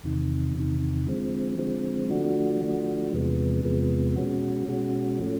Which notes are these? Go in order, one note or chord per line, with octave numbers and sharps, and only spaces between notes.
E2 C3 D#3
E2 C3 D#3
D3 F3 G#3 C4
D3 F3 G#3 C4
D3 F3 A3 D4 F#4
D3 F3 A3 D4 F#4
E2 C3 F3 G#3 B3
E2 C3 F3 G#3 B3
B2 G#3 C#4 F#4
B2 G#3 C#4 F#4
A2 F3 A3 C#4